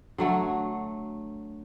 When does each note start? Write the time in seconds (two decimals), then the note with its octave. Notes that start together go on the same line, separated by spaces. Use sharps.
0.18 D3 F#3 A3